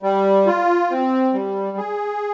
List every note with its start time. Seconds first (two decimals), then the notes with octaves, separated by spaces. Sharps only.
0.03 G3
0.47 F4
0.90 C4
1.34 G3
1.77 G#4